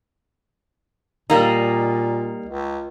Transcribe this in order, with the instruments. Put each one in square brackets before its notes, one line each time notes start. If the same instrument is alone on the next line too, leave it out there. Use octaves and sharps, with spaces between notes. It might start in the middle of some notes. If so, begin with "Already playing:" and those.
[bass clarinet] A#2 [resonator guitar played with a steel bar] G3 A#3 D#4
[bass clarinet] C#2